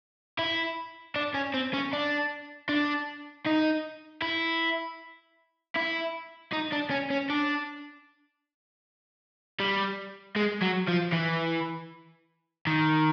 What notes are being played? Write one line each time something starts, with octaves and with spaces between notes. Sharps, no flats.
E4
D4
C#4
C4
C#4
D4
D4
D#4
E4
E4
D#4
D4
C#4
C#4
D4
G3
G#3
F#3
F3
E3
D#3